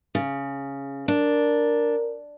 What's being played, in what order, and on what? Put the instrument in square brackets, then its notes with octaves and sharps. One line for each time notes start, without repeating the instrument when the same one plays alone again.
[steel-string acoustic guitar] C#3
[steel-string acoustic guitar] D4 [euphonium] A#4